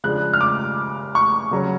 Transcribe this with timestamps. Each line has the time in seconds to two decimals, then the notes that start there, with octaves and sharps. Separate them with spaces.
0.04 C#3 F3 G#3 D4 F#6
0.33 F6
0.41 D6
1.15 C#6
1.51 C#3 F#3 C#4